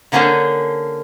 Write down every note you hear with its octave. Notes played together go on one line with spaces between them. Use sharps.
D3 A#3 C#4 D4 G#4 C5